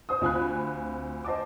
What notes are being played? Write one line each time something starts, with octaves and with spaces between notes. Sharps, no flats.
C5 D#6
D2 C4 F4 G#5 B5 F#6
C5 D#5 A5 D6